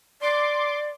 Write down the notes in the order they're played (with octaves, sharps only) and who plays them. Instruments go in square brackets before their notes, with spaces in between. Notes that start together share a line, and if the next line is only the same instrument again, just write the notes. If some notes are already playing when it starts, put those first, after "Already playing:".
[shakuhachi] D5 [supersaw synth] C6 D6